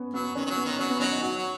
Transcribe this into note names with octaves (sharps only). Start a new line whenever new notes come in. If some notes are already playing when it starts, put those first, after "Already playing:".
Already playing: B3 C#4
F#3 B3
D#3 C#4
D#3
F#3
B3
D#3
F#3 C#4
B3
D#3 F#3 C#4
D#4
F#3 F#4
F#3